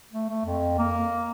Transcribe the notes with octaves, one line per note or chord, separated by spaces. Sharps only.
A3
A3
F2
A#3